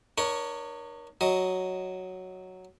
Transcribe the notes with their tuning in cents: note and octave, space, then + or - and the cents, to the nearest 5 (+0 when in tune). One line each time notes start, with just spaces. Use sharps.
D#4 -45 A#4 +35 C#5 +15
F#3 +0 D#5 +5